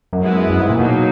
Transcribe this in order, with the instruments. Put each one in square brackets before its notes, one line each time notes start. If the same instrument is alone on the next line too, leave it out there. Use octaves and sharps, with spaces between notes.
[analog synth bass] F#2
[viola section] G#3 B3 E4 G#4 B4
[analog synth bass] F#2
G#2
A#2
[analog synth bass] B2 [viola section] F#3 A#3 D#4